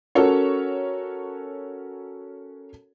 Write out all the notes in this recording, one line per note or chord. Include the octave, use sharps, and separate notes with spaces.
C#4 F#4 A4 A#4 C#5